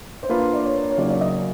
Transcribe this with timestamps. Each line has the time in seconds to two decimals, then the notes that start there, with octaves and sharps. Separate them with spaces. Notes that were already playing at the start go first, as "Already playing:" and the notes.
0.23 C5
0.30 A#3 D4 F4 A#4 B4
0.54 D5
0.65 C#5
0.90 C#5
0.98 C#3 F#3 A#3 D#4 D5
1.10 D5
1.21 D#5